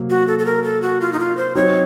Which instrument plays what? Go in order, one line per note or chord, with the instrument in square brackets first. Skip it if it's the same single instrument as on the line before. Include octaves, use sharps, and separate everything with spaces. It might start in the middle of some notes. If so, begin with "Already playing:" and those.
Already playing: [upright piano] C3 F#3 A#3
[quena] F#4
A4
A4
A#4
A4
F#4
F4
D#4
F4
C5
[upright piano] F#3 C4 D#4 F#4 [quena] C#5